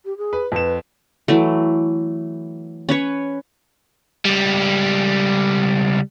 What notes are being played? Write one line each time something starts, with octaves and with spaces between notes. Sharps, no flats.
G4
G#4
B4
F2 B4 E7
E3 F#3 A3
C#4 B4 C#5
C#2 G3